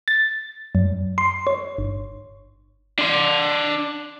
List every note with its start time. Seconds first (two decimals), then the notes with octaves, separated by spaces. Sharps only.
0.08 A6
0.75 F#2
1.18 C6
1.47 C#5
1.78 G1
2.99 D4 C6